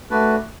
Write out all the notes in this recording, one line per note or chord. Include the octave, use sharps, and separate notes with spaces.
A3 D4 F#4 B4 D5